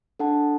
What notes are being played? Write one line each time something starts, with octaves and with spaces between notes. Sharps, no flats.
D4 A4 F#5 A5